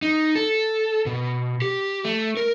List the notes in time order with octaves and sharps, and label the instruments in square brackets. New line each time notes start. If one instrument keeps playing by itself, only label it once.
[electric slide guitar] D#4
A4
B2
G4
A3
A#4